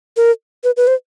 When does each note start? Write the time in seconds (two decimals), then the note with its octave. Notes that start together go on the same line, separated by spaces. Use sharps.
0.17 A#4
0.64 B4
0.77 B4
0.87 C5